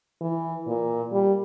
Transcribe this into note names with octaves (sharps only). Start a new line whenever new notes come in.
E3
A#2
G3